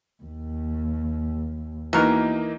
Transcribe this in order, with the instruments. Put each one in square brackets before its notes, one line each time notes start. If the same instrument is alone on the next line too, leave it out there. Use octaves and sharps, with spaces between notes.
[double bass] D#2
[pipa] B2 A#4 [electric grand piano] E3 A#3 D#4